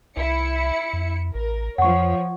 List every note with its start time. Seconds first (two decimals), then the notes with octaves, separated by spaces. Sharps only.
0.17 C2 E4 C#7
0.93 F2
1.35 A1 A#4
1.78 F2 F3 C#5 F#5 C#6